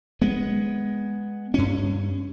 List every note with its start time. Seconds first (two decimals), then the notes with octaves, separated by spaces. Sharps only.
0.22 G#3 B3
1.54 G2 C#4